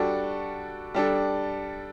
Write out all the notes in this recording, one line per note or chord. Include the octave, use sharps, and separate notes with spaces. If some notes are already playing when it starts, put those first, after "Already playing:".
Already playing: G3 D4 F#4 A4
G3 D4 A4